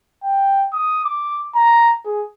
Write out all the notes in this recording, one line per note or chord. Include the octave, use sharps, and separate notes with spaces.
G5
D#6
D6
A#5
G#4